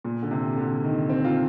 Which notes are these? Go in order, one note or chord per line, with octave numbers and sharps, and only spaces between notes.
A#2
D3
C3
D3
D#3
C4
F4